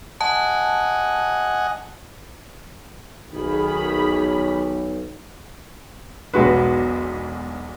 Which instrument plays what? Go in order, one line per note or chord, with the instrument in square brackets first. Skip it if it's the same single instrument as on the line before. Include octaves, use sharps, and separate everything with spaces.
[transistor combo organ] D#5 F#5 G#5 [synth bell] A5
[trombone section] B1 [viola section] D#3 G#4 B5
[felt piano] E1 B1 G#3 F#4 B4